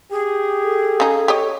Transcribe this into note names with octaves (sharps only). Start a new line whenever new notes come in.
G4 G#4
A4
C#3 D#4
G4 C#5 D#5